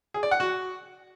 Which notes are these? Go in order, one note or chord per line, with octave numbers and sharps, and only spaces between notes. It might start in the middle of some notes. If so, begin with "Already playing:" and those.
G#4
D5
F#5
F#4